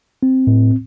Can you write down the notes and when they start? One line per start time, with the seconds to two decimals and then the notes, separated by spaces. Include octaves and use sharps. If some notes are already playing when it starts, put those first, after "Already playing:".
0.23 C4
0.47 A2